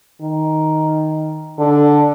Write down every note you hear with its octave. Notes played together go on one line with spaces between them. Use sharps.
D#3
D3